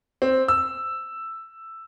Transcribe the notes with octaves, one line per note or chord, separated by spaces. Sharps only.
C4
E6